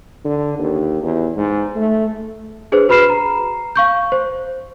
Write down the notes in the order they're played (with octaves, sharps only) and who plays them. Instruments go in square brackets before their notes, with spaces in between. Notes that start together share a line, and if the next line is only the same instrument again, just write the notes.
[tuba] D3
D#2
E2
G#2
A3
[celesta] D4 G#4 B4 C5
F#4 B4 B5 F6 C7 E7
A#5
F5 C#6 G6
C5